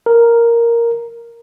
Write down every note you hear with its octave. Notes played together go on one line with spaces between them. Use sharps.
A#4